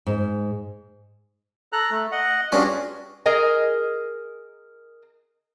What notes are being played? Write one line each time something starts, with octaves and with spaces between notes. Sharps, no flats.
G#2
A4 A#5 F#6
A3
D#5 F#5
G2 C#4 D4 F4 F#4 G#4
G#4 A#4 D#5 G#5